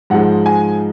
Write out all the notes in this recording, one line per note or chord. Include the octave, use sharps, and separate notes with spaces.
G#2 F3 G#3 F#5
G#5